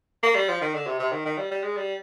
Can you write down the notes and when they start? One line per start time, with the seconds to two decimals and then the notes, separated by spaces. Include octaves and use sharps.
0.23 A#3
0.35 G3
0.49 F3
0.61 D#3
0.74 D3
0.87 C3
0.99 C3
1.12 D#3
1.25 D#3
1.38 G3
1.51 G3
1.64 G#3
1.77 G3